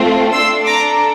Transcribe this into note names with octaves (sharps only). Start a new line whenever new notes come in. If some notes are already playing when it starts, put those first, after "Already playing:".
Already playing: A3 C4 F4
D4 A4 C6 E6
A#5 D6